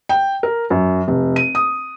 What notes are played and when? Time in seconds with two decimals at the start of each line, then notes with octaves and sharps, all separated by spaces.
0.09 G5
0.43 A#4
0.70 F#2
1.08 F1
1.36 D#7
1.55 D#6